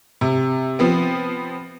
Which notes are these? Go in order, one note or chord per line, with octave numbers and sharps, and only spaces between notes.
C3
F3 B3 C4